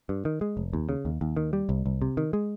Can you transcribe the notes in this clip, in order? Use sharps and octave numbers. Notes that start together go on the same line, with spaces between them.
G2
D#3
G#3
F1
D#2
C#3
D#2
D#2
D#3
G3
C2
C2
C3
D#3
G#3